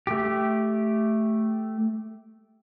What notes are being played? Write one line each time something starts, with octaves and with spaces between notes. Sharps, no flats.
A3 G4